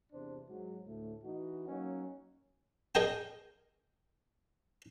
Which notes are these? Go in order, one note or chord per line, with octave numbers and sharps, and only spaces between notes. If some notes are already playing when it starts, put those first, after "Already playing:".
E2 C3 D4 C5
G#2 F#3
D2 A2 A3
E3 D#4 F#4
F#3 A#3 C#4 D#4
G#4 A#4 D#5 G5 G#5